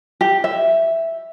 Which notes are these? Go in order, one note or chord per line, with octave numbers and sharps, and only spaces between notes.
G4
E5